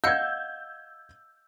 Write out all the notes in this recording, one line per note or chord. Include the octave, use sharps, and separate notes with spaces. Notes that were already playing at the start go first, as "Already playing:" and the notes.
D#5 F5 F#5 E6 G6 G#6